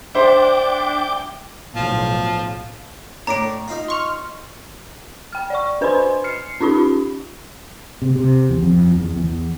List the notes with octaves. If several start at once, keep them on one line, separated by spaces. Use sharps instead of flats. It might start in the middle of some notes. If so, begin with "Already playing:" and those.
D4 C5 E5 G5 D6
B1 A2 F3
A2 D4 A#5 D7
D#4 F4
C6 C#6 F6
G5 F6
D5 C#6
D4 B4 C5 G#5 B5 C6
F6 C7 C#7
C#4 D#4 F4 G4 B5
C3
C3
E2
F2
E2
E2